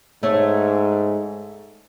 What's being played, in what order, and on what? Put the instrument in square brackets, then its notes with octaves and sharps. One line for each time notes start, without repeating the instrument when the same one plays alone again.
[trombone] G#2 [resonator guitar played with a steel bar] A3 C#5